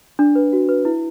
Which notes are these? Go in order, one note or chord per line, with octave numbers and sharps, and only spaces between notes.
D4
B4
F#4
B4
E4